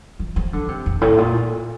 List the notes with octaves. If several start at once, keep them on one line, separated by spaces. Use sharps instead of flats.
F3
F3
D3
C3
F2
A2
A#2